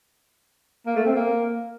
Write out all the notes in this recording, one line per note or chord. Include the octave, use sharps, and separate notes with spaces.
A#3
A3
C4
A#3